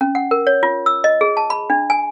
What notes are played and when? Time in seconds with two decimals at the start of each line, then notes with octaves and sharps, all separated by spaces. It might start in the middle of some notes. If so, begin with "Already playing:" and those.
0.01 C#4
0.15 F#5
0.31 A#4
0.47 C#5
0.63 F4
0.86 E6
1.04 D#5
1.21 G#4
1.37 A5
1.50 B5
1.70 D4
1.90 G#5